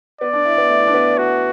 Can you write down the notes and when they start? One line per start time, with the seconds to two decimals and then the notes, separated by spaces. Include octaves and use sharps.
0.21 B3 D5
0.33 D4
0.45 E4
0.58 B3
0.70 A3
0.80 E4
0.87 D4
0.94 B3
1.18 F#4